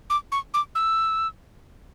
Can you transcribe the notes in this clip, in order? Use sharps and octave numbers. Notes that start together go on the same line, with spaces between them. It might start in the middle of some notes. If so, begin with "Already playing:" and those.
D6
C#6
D6
E6